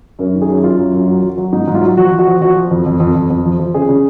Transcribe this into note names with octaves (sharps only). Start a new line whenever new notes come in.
F#2 A#4
D#3
G#4
F#2
F#2 F4
F#2
F#2
F#3
F#3
F#3
G#2 D#4
G#2
F4
F#3
F3 F#4
F3
F#4
F3
F3 F#4
F3
F2
F2
F2
F2
F2
F3
F3
C#3 G#4
C#3